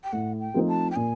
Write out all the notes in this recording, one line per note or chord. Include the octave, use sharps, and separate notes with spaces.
G5
A2 F#5
G5
F3 A3 C4 D#4
A5
G5
A#2 G#5